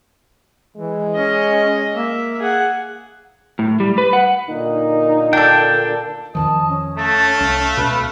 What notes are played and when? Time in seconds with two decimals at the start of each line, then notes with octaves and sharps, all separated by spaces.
0.77 E3 G#3
1.15 C#4 D#5
1.96 A#3 E5
2.39 G#4 F#5
3.59 A2
3.80 G3
3.98 B4
4.13 F#5
4.49 A#2 D3 A#3 D#4
5.33 D4 A4 G5
6.35 F2 D#3 F3 D#5 A5
6.68 C#4
6.98 A3 F5 A5
7.40 C2
7.77 C#2 B2 B4